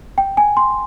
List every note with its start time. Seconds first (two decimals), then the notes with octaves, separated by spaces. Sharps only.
0.18 G5
0.37 G#5
0.57 C6